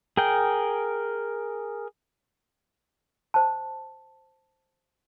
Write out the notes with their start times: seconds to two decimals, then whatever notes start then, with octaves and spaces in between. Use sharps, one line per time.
0.17 G#4 A#4 G5
3.34 C5 A5